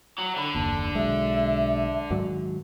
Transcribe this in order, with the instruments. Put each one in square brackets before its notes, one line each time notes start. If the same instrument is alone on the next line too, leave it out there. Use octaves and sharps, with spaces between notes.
[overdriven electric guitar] F#3
[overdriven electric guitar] D3 [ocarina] B5
[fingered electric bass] F#1 D#2 [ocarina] A5
[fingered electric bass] B1 G#3 [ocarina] E5
[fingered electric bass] G#2 D#3 F#3